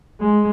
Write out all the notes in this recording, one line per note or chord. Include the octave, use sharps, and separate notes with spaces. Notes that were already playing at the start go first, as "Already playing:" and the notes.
G#3